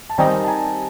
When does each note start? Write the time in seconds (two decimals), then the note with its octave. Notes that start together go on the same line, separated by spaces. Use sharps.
0.09 A5
0.18 D#3 G3 C4 D#4 G#5 A#5
0.44 A5
0.48 G#5 A#5